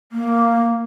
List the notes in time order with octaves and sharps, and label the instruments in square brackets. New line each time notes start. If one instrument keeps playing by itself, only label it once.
[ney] A#3